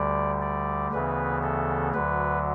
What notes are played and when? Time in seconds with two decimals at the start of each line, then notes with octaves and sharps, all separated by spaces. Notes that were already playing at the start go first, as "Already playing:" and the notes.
Already playing: D2 D3 G3 D5
0.42 D5
0.92 D2 C#3 E3 B3 B4
1.43 A4
1.94 D2 D3 F#3 B4